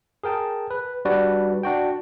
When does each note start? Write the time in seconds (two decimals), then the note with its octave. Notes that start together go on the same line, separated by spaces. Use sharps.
0.24 G#4 A#4 G5 A5
0.70 B4
1.05 G3 D4 F#4 B4 D5
1.63 D4 F#4 G5